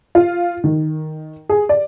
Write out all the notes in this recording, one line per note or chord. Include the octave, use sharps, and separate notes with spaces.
F4
D#3
G#4
D5